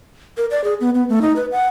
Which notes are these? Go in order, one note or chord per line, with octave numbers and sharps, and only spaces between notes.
A#4
D5
G#4
B3
B3
A3
D#4
B4
F#5